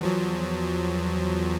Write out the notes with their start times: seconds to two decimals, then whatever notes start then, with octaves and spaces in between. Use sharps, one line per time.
0.01 E2 F3 F#3